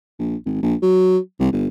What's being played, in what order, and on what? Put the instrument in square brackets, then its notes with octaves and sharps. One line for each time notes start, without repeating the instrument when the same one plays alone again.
[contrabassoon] A#1
G#1
A#1
F#3
C2
G1